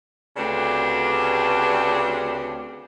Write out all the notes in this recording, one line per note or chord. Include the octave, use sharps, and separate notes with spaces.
D2 C#3 C4 D4 G4 B4